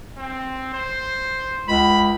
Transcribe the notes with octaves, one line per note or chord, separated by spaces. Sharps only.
C4
C5
C#2 B5